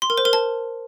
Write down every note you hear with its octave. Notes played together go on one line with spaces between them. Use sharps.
C6
A#4
C5
A#4
A5